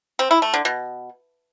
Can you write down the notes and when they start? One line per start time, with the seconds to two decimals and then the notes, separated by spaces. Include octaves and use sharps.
0.19 C4
0.31 E4
0.42 A3
0.54 D3
0.65 B2